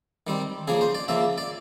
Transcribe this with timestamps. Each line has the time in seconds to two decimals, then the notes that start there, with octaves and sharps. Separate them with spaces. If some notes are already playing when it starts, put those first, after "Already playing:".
0.27 D#3 G3 C4
0.68 C#3 F3 A#3 G#4
0.81 C5
0.95 D5
1.08 C#3 F3 A#3 E5
1.38 D5